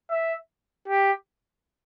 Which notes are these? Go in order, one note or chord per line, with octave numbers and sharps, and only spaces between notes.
E5
G4